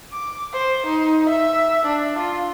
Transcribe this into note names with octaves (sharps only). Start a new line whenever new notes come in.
D6
C5
D#4
E5
D4
F4